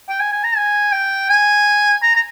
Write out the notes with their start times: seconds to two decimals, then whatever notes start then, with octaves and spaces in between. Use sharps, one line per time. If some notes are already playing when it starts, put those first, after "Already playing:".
0.09 G5
0.20 G#5
0.32 G#5
0.44 A#5
0.56 G#5
0.92 G5
1.29 G#5
2.03 A#5
2.15 A#5